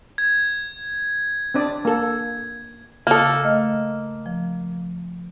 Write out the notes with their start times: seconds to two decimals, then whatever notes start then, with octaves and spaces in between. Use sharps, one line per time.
0.18 G#6
1.54 C4 D4 D5
1.85 A#3 A4
3.07 C#3 A#3 A4 D#6
3.44 A3 D#5 F6
4.26 F3